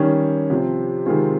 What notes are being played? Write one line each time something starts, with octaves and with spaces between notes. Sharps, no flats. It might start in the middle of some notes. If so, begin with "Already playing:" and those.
Already playing: D#3 G3 C#4 G4
C3 F3 C4
C3 D#3 G#3 C4 F4